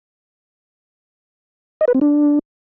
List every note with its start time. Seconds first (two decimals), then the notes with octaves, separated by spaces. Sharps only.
1.81 D#5
1.88 B4
1.95 C4
2.01 D4